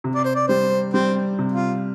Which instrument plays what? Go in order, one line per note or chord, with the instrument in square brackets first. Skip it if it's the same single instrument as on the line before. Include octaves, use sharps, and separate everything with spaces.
[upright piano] C3
[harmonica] D5
C5
D5
[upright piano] G3 [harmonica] C5
[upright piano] G3 [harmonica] C4
[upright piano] C3
[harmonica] F4